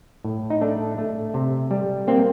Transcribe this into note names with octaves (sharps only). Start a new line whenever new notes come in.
A2
D#4
A3 D4
A3
C3
G3
A#3 C4